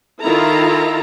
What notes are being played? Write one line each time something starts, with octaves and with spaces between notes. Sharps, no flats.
D#3 E4 F4 A4 A#5